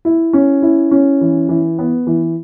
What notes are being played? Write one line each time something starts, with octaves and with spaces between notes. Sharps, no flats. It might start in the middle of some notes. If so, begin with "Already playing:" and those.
E4
C#4
E4
C#4
E3
E3
B3
E3